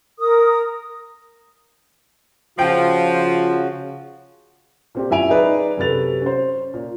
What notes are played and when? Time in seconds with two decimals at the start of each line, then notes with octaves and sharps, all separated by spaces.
0.19 A#4 D#6
2.59 C#3 F3 F4 F#4 G5
4.95 A#2 C4 G4
5.10 F#2 E4 E5 G#5 D7 F7
5.30 D#4 G#4 B4 D5
5.77 F#2 C3 A4 B4 A6 F7
6.22 C#4 C5
6.74 A#2